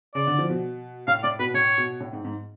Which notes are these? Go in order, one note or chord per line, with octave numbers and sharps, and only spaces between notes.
C#3 D5
D3
F3
B2
A2 F5
A2 D5
B2 B4
A2 C#5
B2
A2
G#2
G#2